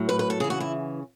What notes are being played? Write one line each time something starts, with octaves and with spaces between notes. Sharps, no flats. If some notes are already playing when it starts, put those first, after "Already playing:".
Already playing: A2 F#3
B4
B4
A4
C#3 E3 G#4
F#4
E4